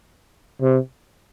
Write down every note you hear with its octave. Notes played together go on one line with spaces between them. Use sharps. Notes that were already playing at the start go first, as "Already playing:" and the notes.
C3